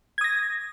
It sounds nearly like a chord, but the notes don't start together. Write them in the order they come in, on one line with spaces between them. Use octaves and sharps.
G#6 D#6 A#6